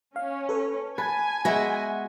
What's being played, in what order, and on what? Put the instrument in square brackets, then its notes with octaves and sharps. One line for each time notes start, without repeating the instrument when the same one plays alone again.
[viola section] C#4 [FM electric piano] F5
[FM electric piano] A4 B4
[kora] B4 [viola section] G#5 [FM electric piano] A5 G#6
[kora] G#3 B3 [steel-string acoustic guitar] F#4 E5 [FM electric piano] A#6